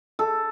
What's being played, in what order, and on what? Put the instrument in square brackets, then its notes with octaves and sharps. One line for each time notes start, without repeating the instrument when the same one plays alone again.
[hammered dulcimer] A4